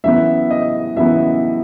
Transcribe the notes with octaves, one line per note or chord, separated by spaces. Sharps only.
F#2 E3 B3 E5
D#5
F#2 E3 B3 E5